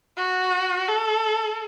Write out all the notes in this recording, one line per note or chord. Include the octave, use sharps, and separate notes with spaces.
F#4
A4